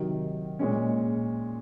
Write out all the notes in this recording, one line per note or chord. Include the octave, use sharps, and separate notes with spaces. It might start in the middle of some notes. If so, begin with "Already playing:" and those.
Already playing: C3 D#3 F#3
A#2 G#3 C#4